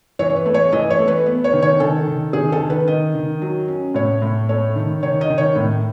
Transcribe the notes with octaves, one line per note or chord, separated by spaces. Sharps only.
E3 C#5
C#5
B4
A3
C#5
E3 D#5
C#5
A3
B4
B3
C#5
D#3
C#5
D#3 A4
D#3
D#3 G#4
A4
D#3
B4
D#3 D#5
D#3
F#3
C#4
A2 C#5
A2
A3 C#5
D#3
D#3 C#5
D#5
D#3
C#5
A2